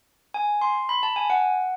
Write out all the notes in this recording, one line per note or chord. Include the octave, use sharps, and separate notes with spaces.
G#5
C6
B5
A5
G#5
F#5